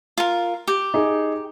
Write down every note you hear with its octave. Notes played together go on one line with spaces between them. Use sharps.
F4 A#4
G4
D#4 G#4